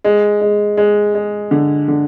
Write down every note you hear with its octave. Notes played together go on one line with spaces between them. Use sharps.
G#3
G#3
G#3
G#3
D3
D3